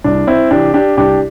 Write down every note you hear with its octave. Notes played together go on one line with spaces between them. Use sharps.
C2 D4
C4 E4
C3 E3 D4 G4
D4 G4
C2 D4 G4